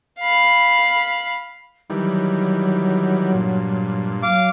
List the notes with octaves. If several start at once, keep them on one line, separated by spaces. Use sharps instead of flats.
F5 B5
D#3 E3 F#3 G3
G2 A#2
F#3 F5 D6